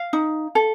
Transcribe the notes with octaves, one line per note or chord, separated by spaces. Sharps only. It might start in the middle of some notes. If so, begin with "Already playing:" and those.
Already playing: F5
D#4
A4